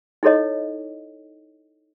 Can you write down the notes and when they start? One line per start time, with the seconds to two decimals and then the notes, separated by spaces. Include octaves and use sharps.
0.23 D#4 E4 A4 C#5 D#5